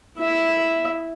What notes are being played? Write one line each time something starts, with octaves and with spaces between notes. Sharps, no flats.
E4 E5